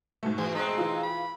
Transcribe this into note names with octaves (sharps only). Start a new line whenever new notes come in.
G#2 B2 A3
E3 G#4
G#3 C4 D#4
E3 F4
B5